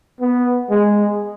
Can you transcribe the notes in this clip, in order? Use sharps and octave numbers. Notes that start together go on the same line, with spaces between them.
B3
G#3